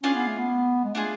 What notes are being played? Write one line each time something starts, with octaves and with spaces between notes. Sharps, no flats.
C#4 D4 F4 G#4
B3
A3
B3
G#3
A3 D4 F4 G#4